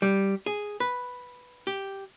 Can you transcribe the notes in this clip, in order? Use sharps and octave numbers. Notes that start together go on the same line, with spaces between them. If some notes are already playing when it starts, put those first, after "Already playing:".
G3
G#4
B4
G4